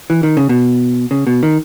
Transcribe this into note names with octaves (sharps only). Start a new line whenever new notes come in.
E3
D#3
C#3
B2
C#3
B2
D#3